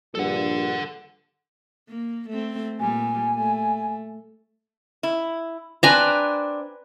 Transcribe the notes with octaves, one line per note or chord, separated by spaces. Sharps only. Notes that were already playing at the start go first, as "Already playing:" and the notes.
A#1 G2 A4 F#5
A#3
A3 C4
A#2 G3 G#5
A3
E4
C4 D4 B4 G#5 A#5